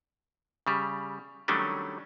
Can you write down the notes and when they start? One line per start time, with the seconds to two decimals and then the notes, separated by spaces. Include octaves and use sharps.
0.67 C#3 G3
1.48 D#3 F#3 G3 A3 C#4 D4